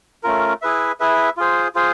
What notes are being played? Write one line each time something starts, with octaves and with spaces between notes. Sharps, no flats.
A3 C#4 F4 A#4
E4 G#4 B4 E5
E4 G#4 B4 E5
F4 G#4 C5
F4 G#4 C5